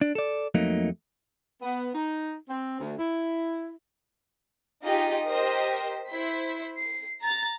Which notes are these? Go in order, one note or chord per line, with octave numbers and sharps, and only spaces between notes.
D4
A4 D5
F2 F#3 A3 A#3 D#4
B3
D#4
C4
D2
E4
D#4 F4 G4 G#4 D#5
G4 A#4 C5 D#5
E4 C5 B6
C7
A#5 A6